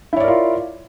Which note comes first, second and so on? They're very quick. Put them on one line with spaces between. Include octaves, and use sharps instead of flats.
E4 C#5 D5 A#4 F4